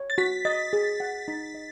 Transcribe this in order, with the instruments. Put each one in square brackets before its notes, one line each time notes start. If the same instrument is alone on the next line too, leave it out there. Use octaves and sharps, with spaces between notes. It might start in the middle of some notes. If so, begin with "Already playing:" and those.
Already playing: [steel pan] C#5
[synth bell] A6
[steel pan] F#4 [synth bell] B6
[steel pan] D#5 [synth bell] A6
[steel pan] G#4
F#5
D#4
D#5